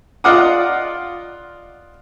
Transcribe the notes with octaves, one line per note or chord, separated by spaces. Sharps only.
F4 D5 D#5 F#5 D6 D#6